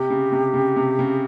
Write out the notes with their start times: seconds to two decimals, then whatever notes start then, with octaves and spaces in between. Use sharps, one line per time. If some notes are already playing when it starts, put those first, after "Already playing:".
Already playing: C3 G4
0.10 C#3
0.32 C3
0.54 C#3
0.76 C3
0.99 C#3